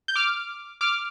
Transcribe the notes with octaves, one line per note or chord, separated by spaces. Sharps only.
G6
D6 F6
D6 F6